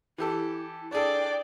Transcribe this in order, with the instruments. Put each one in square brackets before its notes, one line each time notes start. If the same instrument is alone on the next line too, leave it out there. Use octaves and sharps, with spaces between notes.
[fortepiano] E3 G4 A4 [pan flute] E4
[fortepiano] D4 G#4 A4 [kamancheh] D5 G5